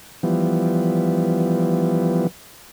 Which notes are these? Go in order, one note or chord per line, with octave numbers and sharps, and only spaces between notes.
E3 F3 G3 B3